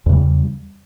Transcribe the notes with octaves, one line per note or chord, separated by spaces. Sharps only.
E2 C#3 G3